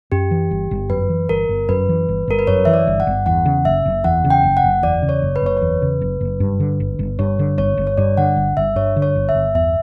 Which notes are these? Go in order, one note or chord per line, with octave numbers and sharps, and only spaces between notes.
F#2 G4
E3
G1
G1
F#2 B4
E3
G1 A#4
G1
F#2 B4
E3
G1
G1 A#4
B4
F#2 C#5
E3 E5
D5
G1
F#5
G1
E2 F#5
C#3
F#1 E5
F#1
E2 F#5
C#3
G5
F#1
F#5
F#1
E2 D5
C#3
C#5
F#1
B4
F#1 C#5
E2 B4
C#3
F#1
F#1
G2
D3
G1
G1
G2 C#5
D3
G1 C#5
G1
C#5
G2 D5
D3 F#5
G1
G1 E5
G2 C#5
D3
C#5
G1
E5
G1
E2 E5